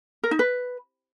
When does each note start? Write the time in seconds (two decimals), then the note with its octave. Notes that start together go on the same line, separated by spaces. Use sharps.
0.23 A#4
0.31 D#4
0.39 B4